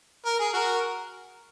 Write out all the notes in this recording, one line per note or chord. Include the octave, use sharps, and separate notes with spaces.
A#4
G#4
F#4 A#4